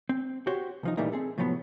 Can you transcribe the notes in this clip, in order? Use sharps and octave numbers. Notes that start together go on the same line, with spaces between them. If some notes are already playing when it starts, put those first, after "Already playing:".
C4
F#4 G4 C5 C#5
C2 F3 D#4
A#2 E3 G3 A3 A#3 D#4
C4 G#4 A4
A2 C3 F3 F#3 B3